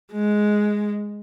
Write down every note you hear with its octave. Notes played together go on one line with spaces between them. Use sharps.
G#3